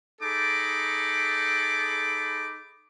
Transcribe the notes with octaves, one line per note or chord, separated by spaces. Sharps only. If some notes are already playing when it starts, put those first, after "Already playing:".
D#4 G#4 A4 B5 D6